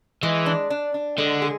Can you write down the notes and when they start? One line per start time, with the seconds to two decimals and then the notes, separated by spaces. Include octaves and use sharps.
0.23 E3 G#3
0.46 D4
0.70 D4
0.94 D4
1.18 D3 G#3
1.42 G#4